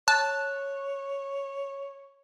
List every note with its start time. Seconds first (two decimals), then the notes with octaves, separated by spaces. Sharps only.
0.08 C#5 A5 F#6